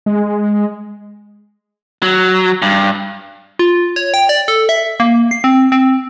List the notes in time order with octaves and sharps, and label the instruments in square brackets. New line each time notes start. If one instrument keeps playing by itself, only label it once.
[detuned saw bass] G#3
[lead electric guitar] F#3
G2
[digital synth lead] F4
C#5
G5
D5
A4
E5
A#3
C7
C4
C4